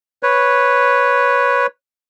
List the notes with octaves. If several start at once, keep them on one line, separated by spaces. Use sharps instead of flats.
B4 C#5